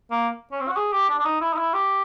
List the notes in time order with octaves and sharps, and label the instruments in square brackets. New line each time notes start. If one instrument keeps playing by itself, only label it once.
[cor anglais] A#3
C#4
C4
F#4
G#4
G4
D4
D4
D#4
E4
D#4
E4
G4